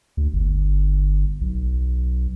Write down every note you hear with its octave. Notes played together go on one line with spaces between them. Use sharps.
D2
G1
B1